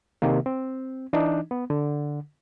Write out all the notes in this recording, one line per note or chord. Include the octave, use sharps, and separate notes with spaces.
C3 D#3 A#3
C4
E3 D4 D#4
B3
D3